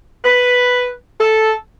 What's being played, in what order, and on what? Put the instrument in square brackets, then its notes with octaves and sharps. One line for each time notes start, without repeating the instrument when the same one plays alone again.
[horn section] B4
A4